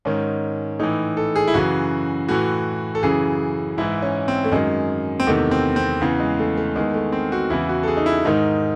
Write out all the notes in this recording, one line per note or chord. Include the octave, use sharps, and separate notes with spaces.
G#2 D#3 C#4
A2 E3 D#4
A4
G#4
E4
F#2 C#3 E3 F#4
A2 E3 F#4
A4
F#2 C#3 E3 G#4
G#2 E3 E4
C#4
C4
A3
F#2 D#3 G#3
C4
E2 C3 D#3 A3
C4
C4
E2 C#3 E3
G#3
A3
A3
E2 D#3 G#3
A3
C4
F#4
E2 C#3 E3 E4
F#4
A4
G#4
D#4
E4
G#2 D#3 D#4